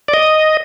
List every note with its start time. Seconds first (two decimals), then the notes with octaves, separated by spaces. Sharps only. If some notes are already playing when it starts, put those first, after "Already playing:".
0.08 D5
0.14 D#5